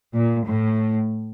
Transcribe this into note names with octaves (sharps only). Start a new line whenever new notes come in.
A#2
A2